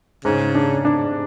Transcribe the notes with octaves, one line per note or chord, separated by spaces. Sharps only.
G#2 C#3
D4
D4